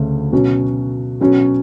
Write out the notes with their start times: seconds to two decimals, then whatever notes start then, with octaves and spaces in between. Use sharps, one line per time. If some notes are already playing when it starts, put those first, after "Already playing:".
Already playing: D2 C#3 A3
0.32 B2 F#3 C#4
1.21 B2 F#3 C#4